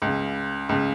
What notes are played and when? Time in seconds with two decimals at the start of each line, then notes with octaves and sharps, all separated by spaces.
0.02 C#2
0.07 C#3
0.69 C#2 C#3